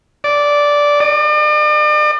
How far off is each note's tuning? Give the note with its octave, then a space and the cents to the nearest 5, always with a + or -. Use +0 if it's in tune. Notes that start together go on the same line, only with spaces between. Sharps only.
D5 -10
D5 +40